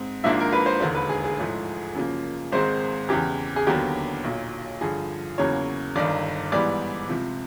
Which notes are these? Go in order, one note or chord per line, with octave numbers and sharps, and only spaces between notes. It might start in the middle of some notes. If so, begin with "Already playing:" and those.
Already playing: G#2 C4
G#1 G#2 F3 A#3 D4 E5
A#4
B4
C5
E1 D#2 D3 C5
B4
G#4
G#4
A1 G#2 F3 A3
F#2 C#3 F3 A#3
G#1 G#2 D#3 G#3 C4 C5
E2 C#3 E3 G4
G#4
D#2 D3 F#3 B3 D4 G4
B1 A#2 F#3
G2 D3 F3 G#4
E2 C#3 F#3 A#3 C#5
G1 G2 D#3 D5
G#2 E3 G3 B3 D5
C#2 C3 F3